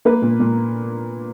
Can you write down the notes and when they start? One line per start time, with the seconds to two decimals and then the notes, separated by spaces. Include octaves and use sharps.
0.05 A#3 B4
0.22 A#2
0.40 A#2